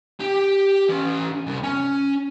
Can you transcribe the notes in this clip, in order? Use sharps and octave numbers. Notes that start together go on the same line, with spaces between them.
G4 G5
E3 C#4
C2
C#4